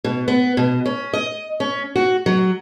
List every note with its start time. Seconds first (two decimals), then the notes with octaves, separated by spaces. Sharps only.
0.05 B2
0.28 B3
0.57 B2
0.86 C#4
1.13 D#5
1.60 C#4
1.96 F#4
2.26 F#3